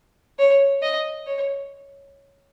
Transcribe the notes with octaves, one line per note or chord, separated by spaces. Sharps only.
C#5
D#5
C#5